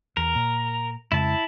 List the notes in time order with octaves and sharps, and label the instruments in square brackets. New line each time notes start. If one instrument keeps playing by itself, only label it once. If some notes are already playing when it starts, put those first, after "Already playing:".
[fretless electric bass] E2 [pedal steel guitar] A#4
[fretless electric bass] A#2
[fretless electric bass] F2 C#3 G#3 [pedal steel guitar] E4 A5